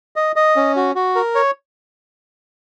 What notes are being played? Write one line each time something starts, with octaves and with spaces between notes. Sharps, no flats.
D#5
D#5
C#4
F#4
F#4
A#4
C#5